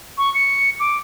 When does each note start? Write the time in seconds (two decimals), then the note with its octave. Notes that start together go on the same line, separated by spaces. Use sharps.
0.18 C#6
0.34 C#7
0.80 D6